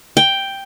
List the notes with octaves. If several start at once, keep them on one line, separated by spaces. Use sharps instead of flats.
G5